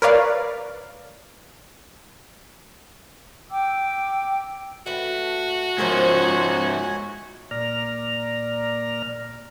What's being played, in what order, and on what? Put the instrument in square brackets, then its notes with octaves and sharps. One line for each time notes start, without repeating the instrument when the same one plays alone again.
[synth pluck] A#4 B4 C#5 D5 F5
[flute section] G5 D6 E6
[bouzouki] A3 B4 [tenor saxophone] F#4
[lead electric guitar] G#2 F3 [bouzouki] F4 A#4 C5 [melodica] C#5 G#5
[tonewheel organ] A#2 D5 A#5 F6